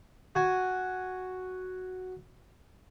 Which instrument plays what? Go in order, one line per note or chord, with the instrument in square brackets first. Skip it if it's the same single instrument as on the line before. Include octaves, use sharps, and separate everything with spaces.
[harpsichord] F#4 G#5